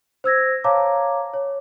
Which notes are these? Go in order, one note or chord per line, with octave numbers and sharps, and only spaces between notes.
C5 E6 G#6 A#6
C#5 F5 A5 A#5 D6
C#5